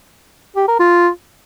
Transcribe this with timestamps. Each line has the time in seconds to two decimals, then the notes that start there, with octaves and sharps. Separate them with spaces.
0.56 G4
0.68 A#4
0.80 F4